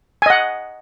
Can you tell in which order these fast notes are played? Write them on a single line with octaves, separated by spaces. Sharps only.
G#5 D#5 F#5